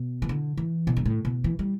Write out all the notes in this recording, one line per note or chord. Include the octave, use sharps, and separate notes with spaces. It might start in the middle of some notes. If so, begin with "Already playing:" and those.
Already playing: B2
E3
D3
E3
B2
G2
A2
B2
E3
G3